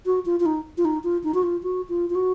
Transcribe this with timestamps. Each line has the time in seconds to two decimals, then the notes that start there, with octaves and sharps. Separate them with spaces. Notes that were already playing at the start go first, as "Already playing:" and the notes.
0.06 F#4
0.25 F4
0.40 F4
0.46 D#4
0.78 F4
0.85 D#4
1.04 F4
1.24 D#4
1.34 F#4
1.43 F4
1.63 F#4
1.89 F4
2.10 F4
2.15 F#4